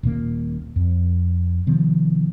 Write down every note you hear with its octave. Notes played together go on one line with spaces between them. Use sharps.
D#1 A#2 A#3
F2
C3 D#3 F3 B3